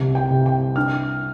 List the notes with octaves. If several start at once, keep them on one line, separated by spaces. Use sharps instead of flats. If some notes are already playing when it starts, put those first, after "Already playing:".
Already playing: C2 C3
G5
C3
G5
D4 F6